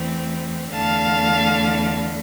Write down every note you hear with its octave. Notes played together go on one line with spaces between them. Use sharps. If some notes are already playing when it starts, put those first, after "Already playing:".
Already playing: E2 E3 A3 C4
E2 D3 A3 F5 A5